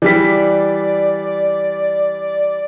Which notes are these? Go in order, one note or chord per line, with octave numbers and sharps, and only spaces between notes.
E3 G3 D5 B6